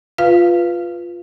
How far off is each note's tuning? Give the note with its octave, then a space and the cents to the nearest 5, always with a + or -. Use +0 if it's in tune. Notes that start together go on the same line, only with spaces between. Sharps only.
F4 +0 B4 +0 F5 -15